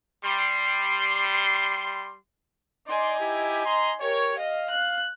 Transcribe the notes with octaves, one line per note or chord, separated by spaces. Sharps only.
G3 C6
D#4 D5 G#5 C6
E4 G4
D#5 A#5 C6
G4 A#4 C#5
D#5 F5
F#6